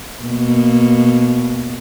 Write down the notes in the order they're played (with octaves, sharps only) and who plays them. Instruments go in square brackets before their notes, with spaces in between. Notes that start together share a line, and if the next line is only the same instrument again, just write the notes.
[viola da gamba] B2 A#3